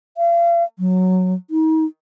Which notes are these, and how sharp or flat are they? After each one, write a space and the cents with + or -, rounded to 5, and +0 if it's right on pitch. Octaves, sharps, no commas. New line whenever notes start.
F5 -40
F#3 -5
D#4 +35